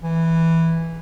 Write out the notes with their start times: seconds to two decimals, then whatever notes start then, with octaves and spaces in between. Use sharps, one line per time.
0.03 E3